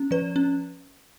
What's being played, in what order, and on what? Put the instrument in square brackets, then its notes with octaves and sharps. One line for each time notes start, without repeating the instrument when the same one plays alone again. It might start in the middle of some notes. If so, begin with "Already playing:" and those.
Already playing: [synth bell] C#4
F3 B4
C#4